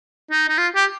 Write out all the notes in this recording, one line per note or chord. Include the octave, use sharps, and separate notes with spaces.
D#4
D#4
F4
G4